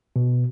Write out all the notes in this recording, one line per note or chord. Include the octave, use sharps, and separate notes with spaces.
B2